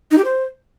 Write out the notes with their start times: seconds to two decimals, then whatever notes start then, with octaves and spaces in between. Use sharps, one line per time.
0.11 D#4
0.18 G4
0.25 C5